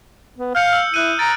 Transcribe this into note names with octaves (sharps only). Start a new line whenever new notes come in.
B3
F5 F6 G6 C#7
E6
E4 D#6 F#6 D#7
A#5 A6 D7